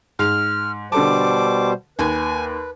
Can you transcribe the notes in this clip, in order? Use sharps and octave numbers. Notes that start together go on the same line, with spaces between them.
G#2 F6
B2 D3 G3 A4 C5 A5 D6
D#2 B4 G#5